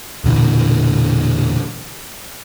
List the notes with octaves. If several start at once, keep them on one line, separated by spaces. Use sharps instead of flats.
E1 A#2 D3 E3